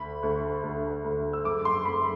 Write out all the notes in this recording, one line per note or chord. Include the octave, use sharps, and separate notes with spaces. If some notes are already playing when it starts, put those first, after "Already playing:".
Already playing: D2 B5
D2
D2
D2
E6
F#1 D6
C6
F#1 B5